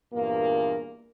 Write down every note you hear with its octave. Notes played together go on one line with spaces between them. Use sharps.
E2 G2 A#2 A#3